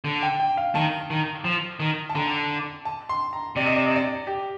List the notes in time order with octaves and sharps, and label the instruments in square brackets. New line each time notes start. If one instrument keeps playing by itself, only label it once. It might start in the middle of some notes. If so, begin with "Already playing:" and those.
[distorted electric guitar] D3
[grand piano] G5
G5
F5
[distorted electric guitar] D#3 [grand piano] A5
[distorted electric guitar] D#3
F3
D#3
[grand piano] A5
[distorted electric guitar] D3 [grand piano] A#5
[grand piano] A5
C6
A#5
[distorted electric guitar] C3 [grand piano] D5
[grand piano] D#5
D5
D#5
D5
G4